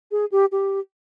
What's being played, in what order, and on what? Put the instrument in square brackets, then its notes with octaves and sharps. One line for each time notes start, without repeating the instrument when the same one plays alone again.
[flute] G#4
G4
G4